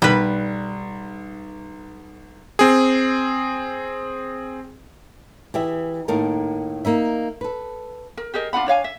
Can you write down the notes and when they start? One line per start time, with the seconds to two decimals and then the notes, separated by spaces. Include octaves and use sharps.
0.02 B1 G3 B4
2.59 C4 G#4
5.54 E3 G4 G#4 E5
6.08 A2 D#3 A#3 A4 A#4
6.85 A#3 D#4 E5
7.41 A4 B4
8.17 A#4
8.34 G4 G#4 A#4 D#5
8.53 D4 F4 F#5 B5
8.66 D4 C#5 F5 G#5
8.84 E5